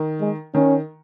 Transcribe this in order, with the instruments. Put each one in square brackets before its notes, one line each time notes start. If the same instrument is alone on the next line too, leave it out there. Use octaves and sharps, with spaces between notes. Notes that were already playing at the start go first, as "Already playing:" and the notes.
Already playing: [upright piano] D#3
[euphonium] G#3
[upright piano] D#3 [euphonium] C#4